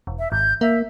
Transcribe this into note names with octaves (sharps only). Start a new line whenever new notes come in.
E1
E5
G#1 G6
A#3 E5